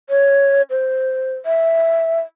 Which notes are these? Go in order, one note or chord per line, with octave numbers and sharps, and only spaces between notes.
C#5
C5
E5